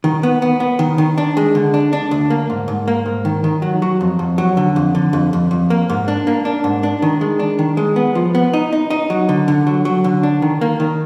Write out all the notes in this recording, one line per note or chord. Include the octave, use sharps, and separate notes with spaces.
D#3
B3
B3
B3
D#3
D#3
D4
G#3
D3
D4
D4
D2
A#3
G#2
G#2
A#3
G#2
D#3
D#3
F#3
F#3
F2
F2
F#3
D3
F2
D3
F2
F2
F2
A#3
G#2
D4
A#3
D4
G#2
D4
D#3
G#3
D4
D#3
G#3
B3
F3
B3
D#4
D#4
D#4
F#3
D3
D3
F#3
F#3
D3
D4
D#3
A#3
D#3